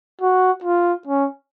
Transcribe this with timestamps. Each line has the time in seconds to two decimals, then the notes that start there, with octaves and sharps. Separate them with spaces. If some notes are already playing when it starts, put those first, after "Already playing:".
0.21 F#4
0.64 F4
1.07 C#4